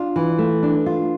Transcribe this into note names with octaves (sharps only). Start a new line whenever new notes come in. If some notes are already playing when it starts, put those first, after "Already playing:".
Already playing: D4 F4
E3
A3
D4
F4